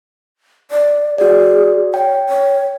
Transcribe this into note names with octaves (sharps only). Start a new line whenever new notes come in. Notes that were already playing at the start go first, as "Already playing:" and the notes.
D5
F#4 G#4 D5
C#5 G5
C#5